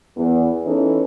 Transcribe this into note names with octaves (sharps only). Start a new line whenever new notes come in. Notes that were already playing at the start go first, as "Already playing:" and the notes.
E2
E3 C#4 D#4 A4 B4 C#5